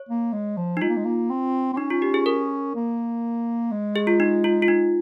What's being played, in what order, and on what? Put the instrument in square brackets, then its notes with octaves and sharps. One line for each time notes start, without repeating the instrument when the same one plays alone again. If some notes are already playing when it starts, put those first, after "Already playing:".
Already playing: [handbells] C#5
[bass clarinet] A#3
G#3
F3
[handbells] D#4
[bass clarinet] G#3 [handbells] F4
[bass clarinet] A#3
G#3
A#3
C4
C4
[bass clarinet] C#4 [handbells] D#4
[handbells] F4
G4
G#4
A#4
[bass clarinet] A#3
G#3
[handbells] G#4
F4
D#4
F4
F4
D#4